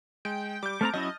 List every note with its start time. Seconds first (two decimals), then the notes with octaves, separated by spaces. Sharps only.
0.25 G#3 G5
0.63 G3 D6 G6
0.81 A3 C4 A5 A#5 F6 A6
0.94 F#3 C#4 E4 D#5